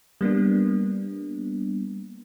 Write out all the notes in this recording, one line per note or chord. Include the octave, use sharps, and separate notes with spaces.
G3 A#3 B3 D4